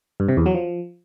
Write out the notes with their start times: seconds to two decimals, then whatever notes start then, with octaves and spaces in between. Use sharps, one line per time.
0.20 G2
0.28 C3
0.37 E2
0.46 F#3
0.55 F3